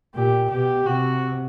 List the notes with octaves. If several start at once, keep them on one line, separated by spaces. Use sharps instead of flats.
A#2 G4
B2 G4
C3 F#4